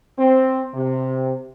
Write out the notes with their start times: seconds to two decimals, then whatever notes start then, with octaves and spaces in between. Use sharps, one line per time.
0.19 C4
0.74 C3